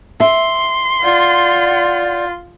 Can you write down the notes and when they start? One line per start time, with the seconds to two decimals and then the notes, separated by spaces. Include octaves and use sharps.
0.20 E5 C6
1.02 F4 D5 F#5 G6